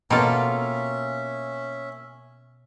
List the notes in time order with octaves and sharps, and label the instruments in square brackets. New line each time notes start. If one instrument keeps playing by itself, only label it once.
[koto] B2 A4 [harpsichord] A#3 [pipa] C4 F4 [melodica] C#4 E5